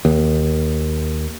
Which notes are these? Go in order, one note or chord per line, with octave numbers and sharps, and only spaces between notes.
D#2